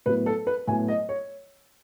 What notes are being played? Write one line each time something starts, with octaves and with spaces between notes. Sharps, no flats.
A2 F#3 B3 B4
A4
B4
A2 F#3 B3 G#5
D#5
C#5